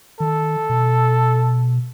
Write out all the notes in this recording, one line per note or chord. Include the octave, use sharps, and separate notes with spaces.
D#3 A4
B2